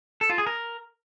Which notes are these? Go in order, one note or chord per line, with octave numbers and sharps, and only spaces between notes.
A4
F4
G#4
A#4